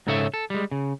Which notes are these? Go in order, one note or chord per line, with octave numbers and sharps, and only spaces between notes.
G#2 C#3 D#4 A4 C#5 E5
A4
G3 G#3
C#3